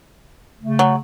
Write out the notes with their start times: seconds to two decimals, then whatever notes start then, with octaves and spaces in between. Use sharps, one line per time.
0.61 C#3 A3
0.79 F#3